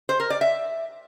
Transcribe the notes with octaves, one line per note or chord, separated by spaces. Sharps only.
C5
A#4
D5
E5